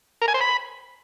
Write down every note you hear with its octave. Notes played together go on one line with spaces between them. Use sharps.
A#4
G#5
C5
B5